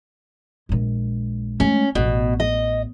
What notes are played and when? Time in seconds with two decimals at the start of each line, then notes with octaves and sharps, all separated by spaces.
0.69 A#1 G#3
1.60 G#3 A3 C#4
1.95 A1 B2
2.40 D#5